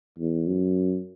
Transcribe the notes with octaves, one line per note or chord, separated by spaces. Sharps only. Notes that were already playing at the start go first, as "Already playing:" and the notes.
E2
F#2